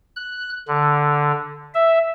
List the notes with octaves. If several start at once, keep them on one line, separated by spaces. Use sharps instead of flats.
F#6
D3
E5